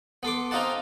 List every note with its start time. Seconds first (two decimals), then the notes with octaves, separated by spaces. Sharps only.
0.23 B3 A4 C6 D6
0.51 C4 D#4 F4 D#5 F#5 A5